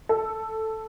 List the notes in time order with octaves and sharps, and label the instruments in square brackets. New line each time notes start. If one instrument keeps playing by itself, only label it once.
[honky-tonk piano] A4